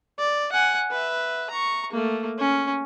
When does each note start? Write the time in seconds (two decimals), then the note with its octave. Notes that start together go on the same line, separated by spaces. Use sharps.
0.18 D5
0.52 F#5 G#5
0.91 B4 E5
1.50 A#5 C#6
1.92 A3 A#3
2.38 C#4